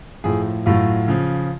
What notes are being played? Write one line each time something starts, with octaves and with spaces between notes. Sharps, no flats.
A2 F3 G#4
A2 F#3 F4
C#3 F3